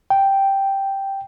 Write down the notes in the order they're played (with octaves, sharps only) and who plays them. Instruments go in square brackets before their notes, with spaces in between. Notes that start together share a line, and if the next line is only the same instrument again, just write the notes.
[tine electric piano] G5